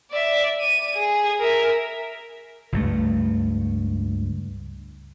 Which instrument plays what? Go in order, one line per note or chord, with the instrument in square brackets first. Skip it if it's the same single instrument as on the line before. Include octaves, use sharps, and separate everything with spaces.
[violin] D5 E5
D#7
G#4
A#4 E5
[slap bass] C#2 G2 A3